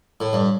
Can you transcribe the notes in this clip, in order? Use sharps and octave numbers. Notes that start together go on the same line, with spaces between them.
A2
G2